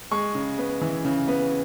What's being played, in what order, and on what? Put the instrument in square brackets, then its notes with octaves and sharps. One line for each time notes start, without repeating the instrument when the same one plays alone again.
[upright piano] G#3 C#6
C#3
B3
E3
C#3
B3